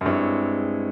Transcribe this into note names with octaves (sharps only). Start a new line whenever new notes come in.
F#2
G2 G#3 C4 E4 G#4 C#5